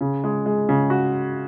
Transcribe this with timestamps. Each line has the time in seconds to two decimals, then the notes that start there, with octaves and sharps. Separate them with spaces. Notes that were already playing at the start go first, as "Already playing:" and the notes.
0.01 C#3
0.24 G#3
0.46 G#3
0.69 C#3
0.90 F#4